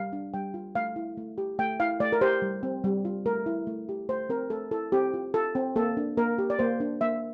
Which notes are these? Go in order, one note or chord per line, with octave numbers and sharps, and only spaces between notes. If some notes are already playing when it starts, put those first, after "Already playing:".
Already playing: G3 F5
D4
G3 G5
F4
A3 F5
E4
A3
G4
A3 G5
E4 F5
A3 D5
A#4
G4 C5
G3
C4
G3
F4
A3 A#4
E4
A3
G4
A3 C5
C4 A#4
A3 A4
E4 A4
C4 G4
F4
F4 A4
C4
A#3 A4
D4
A#3 A#4
G4
D5
A#3 C5
D4
A#3 E5